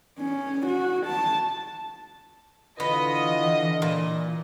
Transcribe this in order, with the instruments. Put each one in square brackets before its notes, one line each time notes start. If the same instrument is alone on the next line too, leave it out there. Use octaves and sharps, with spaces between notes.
[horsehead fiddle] C#4
F#4
A5
[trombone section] D3 F4 [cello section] E3 [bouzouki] B3 [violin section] D#5
[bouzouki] A#2